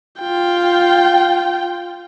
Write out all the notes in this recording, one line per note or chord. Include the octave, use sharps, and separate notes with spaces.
F4 G5